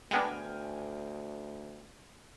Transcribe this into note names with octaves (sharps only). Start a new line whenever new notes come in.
D2 G#3 B3 D4 G5 G#5 F6